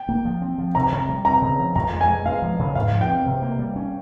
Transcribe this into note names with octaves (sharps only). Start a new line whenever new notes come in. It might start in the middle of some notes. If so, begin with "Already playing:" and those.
Already playing: G5
A#3
F3
C4
F3
C3 A#5
C3
G3
C4 A#5
C#3
F3
F2 A#5
G#3
G#5
G#3
G#3 F5
F3
C#3
G#2 F5
F3
G5
C4
C3
A#3
G3
C#4